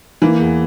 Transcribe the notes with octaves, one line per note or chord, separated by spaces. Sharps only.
E3 A#3
E2